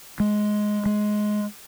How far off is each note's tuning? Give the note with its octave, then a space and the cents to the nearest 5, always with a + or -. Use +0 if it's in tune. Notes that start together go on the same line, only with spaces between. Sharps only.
G#3 +10
G#3 +15